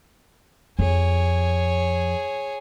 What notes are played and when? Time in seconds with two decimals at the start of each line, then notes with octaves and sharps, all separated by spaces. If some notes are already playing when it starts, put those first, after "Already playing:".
0.79 F2 G#4 C#5